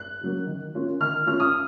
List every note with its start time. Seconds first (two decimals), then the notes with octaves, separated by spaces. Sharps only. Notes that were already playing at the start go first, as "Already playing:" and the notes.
Already playing: F#6
0.21 C#3 F#3 A#3
0.47 D#3
0.75 A#3 C#4 F4
1.00 D#3 F6
1.26 A#3 C#4 F4 F6
1.40 D#6